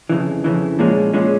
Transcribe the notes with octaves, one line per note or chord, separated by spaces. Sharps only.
F2 C#3 E3
F2 C#3 E3
A#2 F3 G#3 C#4
A#2 F3 G#3 C#4